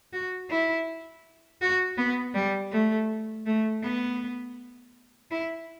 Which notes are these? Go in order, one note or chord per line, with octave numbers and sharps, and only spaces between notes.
F#4
E4
F#4
B3
G3
A3
A3
B3
E4